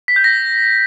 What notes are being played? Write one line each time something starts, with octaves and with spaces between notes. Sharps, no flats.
B6
G6
A#6